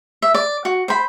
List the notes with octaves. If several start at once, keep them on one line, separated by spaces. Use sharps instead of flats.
E5
D5
F#4
C5 B5